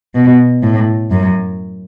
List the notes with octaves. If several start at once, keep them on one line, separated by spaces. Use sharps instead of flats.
B2
A2
F#2